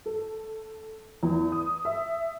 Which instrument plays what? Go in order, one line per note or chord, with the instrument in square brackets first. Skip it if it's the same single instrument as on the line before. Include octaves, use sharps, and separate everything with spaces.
[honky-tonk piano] A4
E2
D#6
E5